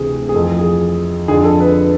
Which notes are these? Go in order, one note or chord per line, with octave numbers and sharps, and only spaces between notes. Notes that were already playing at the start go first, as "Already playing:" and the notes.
Already playing: D2 C3 E3 G#4
G#4
F2 E3 A4
G#4
F2 D3 G#4
A4
B4